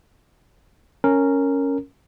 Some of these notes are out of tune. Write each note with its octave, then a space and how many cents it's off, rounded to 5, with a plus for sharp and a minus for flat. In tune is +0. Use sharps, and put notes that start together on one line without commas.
C#4 +0 A#4 -10